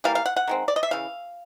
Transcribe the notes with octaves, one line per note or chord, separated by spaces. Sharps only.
E3 G3 A#3 F5
F5
F#5
F#5
D#3 G#3 C4
D5
D#5
E5
C#3 E3 F5